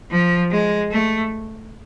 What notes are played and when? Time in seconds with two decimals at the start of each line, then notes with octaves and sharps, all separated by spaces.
0.11 F3
0.51 G#3
0.91 A3